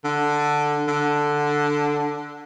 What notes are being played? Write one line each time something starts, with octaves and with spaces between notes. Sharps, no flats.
D3
D3